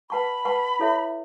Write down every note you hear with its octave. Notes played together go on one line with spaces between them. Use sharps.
B4 F#5 A5 B5 C#6
B4 F#5 A5 C#6
E4 A4 C#5 E5